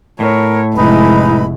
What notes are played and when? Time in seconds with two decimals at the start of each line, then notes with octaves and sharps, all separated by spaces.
0.20 A2 A#4 C#5
0.76 F1 G#3 D#4 E4 B4 B5